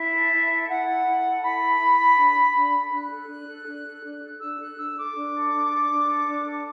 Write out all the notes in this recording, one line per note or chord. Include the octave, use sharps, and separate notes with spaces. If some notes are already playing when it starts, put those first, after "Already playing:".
Already playing: E4 E5
A4
E4
A4
E4 F#5
A4
E4
A4
E4 B5
A4
E4
A4
D4
A4
D4
A4
D4 F#6
A4
D4
A4
D4
A4
D4
A4
D4 E6
A4 F#6
D4 E6
A4 D6
D4
A4
D4
A4
D4
A4
D4
A4